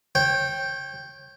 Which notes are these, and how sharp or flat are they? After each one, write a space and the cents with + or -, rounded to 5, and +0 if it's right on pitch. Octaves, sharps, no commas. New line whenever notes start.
C#5 -30 G5 +0